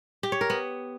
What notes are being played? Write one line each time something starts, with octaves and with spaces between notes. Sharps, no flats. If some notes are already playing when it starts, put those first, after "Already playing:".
G4
C#5
A#4
B3